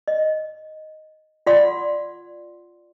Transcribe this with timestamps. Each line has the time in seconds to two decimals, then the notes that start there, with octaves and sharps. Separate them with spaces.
0.08 D#5
1.46 F4 D5 F#5 C6